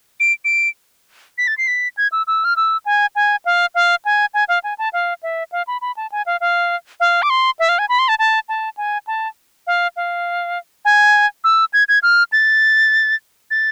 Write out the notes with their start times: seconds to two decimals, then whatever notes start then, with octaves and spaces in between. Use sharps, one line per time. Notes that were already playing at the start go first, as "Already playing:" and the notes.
0.20 D7
0.45 D7
1.38 B6
1.48 A6
1.58 C7
1.67 B6
1.97 G#6
2.12 E6
2.27 E6
2.45 F6
2.56 E6
2.86 G#5
3.15 G#5
3.45 F5
3.75 F5
4.05 G#5
4.34 G#5
4.49 F5
4.64 G#5
4.79 A5
4.93 F5
5.23 E5
5.52 F5
5.67 B5
5.81 B5
5.97 A5
6.12 G#5
6.26 F5
6.41 F5
7.00 F5
7.22 D6
7.30 C6
7.59 E5
7.69 F5
7.79 G#5
7.89 B5
7.99 C6
8.08 A5
8.19 A5
8.49 A5
8.77 G#5
9.07 A5
9.67 F5
9.96 F5
10.85 G#5
11.44 E6
11.73 G#6
11.89 G#6
12.03 F6
12.32 A6
13.51 A6